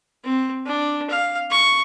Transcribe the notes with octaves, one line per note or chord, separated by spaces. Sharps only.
C4
D4
F5
C#6